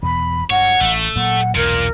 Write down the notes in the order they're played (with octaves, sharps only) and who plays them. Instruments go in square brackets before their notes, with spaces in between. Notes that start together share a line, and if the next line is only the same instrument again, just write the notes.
[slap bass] E2 B2 [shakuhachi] B5
[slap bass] G2 [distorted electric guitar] C#5 [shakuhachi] F#5
[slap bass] A1 [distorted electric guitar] A3
[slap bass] A#2 F#3 A#3 [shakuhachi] F#5
[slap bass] B1 E2 G2 [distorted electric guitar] A#2 [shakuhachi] A#4